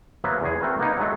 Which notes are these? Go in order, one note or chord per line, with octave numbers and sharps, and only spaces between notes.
F#3 A#3 B3 B4 C5 E5
E2 G#4
A3 C4 F#4 A#4 B4
A#3 B3 D#4
F#3 G#3 A3